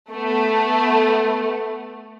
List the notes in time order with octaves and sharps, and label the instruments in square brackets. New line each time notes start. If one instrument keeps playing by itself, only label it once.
[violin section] A3 B3